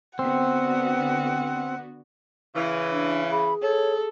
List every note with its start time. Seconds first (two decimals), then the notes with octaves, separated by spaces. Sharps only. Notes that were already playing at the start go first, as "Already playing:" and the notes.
0.19 D3 B3 C4 F#4 F#5
2.55 C#3 E3
2.92 D4
3.31 G#4 B5
3.62 A4 C#5